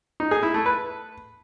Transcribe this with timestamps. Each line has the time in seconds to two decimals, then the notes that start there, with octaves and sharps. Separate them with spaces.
0.20 D#4
0.31 G#4
0.43 E4
0.54 A3
0.66 B4